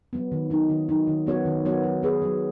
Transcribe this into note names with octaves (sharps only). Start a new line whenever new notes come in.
F#3 B3
D#3
F#3 D#4
D#3
F#3 D#4
D#3
F#3 B3 F#4 C#5
D#3
F#3 B3 F#4 C#5
F#3
B3 G#4 B4
F#3